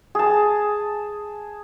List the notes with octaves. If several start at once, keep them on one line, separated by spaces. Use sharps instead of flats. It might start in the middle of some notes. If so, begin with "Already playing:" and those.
G#4 A5